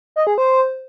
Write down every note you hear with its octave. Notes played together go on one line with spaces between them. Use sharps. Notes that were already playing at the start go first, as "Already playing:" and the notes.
D#5
G#4
C5